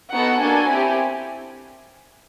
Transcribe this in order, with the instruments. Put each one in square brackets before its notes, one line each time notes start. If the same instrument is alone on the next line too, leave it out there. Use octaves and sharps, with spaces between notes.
[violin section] B3 D#4 F#4 A4 F#5
A#3 D4 F#4 A4 G#5
C4 E4 G4